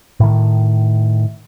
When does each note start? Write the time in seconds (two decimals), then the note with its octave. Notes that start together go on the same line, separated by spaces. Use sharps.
0.20 A2 D#3